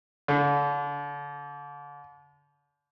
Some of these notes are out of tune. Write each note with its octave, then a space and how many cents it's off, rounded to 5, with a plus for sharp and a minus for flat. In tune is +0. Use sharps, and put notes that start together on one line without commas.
D3 -35